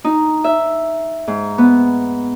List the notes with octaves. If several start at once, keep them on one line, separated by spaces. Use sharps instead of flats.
D#4
E5
G#2
B3